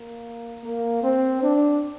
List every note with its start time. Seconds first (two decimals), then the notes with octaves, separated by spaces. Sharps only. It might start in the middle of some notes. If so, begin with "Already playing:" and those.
Already playing: A#3
0.63 A#3
1.03 C4
1.42 D4